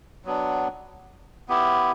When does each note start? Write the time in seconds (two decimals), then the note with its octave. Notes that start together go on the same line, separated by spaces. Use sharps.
0.25 F#3 B3 D4
1.48 B3 E4 G4